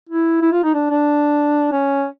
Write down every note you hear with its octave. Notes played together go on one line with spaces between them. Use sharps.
E4
E4
F4
D#4
D4
D4
C#4